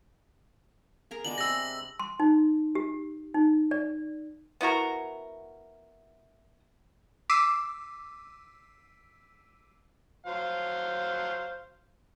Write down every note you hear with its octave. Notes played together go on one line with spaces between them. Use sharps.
G#4 A#4 A#5
G#3 B3 D4 F#7
C3 B5 E6 A#6
C6
D#4
G4
D#4
D5
B3 E4 F#4 A#4
D6 E6 B6 C7 D#7 E7
F#3 C5 F5